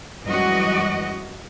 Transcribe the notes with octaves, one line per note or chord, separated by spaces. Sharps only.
F#2 E3 G3 G#3 F#4 D#5